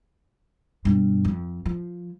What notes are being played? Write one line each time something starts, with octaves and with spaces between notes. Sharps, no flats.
G2 B2
F2
F3